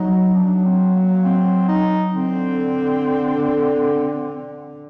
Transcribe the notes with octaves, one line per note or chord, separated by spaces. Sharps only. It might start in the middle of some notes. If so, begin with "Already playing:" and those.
Already playing: F#3 D#4
F#3 D4
C4
A#3
C4
D#4
D3 C4